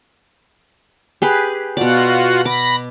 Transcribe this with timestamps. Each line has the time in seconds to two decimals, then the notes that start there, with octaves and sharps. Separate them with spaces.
1.22 G4 G#4 B4
1.77 B2 F4 F#4 D5 F#5
2.45 B5 D6 A#6